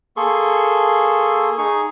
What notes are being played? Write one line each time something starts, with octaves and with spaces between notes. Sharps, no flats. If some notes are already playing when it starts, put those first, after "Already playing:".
A#3 G#4 A4 C6 C#6
D#4 G#4 C#6